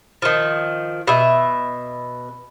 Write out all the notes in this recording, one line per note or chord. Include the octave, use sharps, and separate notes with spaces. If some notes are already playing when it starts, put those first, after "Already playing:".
D#3 F3
B2 E5